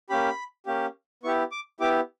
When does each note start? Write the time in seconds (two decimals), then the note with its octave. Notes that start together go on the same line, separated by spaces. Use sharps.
0.10 A#3 C#4 G4 B5
0.66 A#3 C#4 G4
1.23 B3 E4 G4 C#6
1.52 D6
1.80 B3 E4 G4 D6